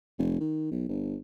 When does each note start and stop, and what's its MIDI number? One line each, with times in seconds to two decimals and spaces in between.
0.19 0.40 29
0.40 0.68 51
0.71 0.89 35
0.89 1.16 31